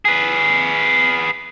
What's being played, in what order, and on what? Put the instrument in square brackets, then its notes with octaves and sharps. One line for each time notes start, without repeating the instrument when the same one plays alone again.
[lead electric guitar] G#4 B4